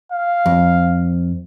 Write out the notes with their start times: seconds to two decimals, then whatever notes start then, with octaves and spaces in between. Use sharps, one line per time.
0.12 F5
0.46 F2